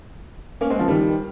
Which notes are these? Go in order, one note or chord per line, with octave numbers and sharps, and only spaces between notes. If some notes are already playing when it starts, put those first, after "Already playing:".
A#3 C#4
G#3 C4
C#3 F3
D#3 G3